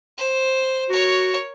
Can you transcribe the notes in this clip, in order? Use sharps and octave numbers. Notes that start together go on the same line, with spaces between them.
C5
F#4 A#4 C#5